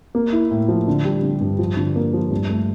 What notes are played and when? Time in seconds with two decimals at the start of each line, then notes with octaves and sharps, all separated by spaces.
0.15 A#3
0.32 E4
0.51 A2
0.68 F3
0.88 D3
1.05 G3
1.23 D3
1.41 G2
1.59 F3
1.77 D3
1.96 A#3
2.13 F3
2.31 G2
2.50 A3